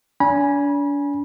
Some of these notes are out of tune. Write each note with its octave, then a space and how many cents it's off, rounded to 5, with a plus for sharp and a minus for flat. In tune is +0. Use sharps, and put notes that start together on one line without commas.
D4 -40 G#5 +0 B5 -35